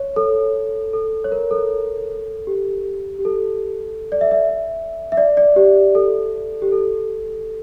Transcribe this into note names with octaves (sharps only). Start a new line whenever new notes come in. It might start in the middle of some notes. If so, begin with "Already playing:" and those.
Already playing: C#5
A4
A4
C#5
A#4
A4
G4
G4
A4
D5
E5
E5
E5
D5
D5
G4
A4
G4
A4